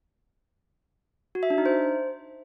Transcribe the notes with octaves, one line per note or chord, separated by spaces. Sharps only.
F#4
E5
D4
D#4
C5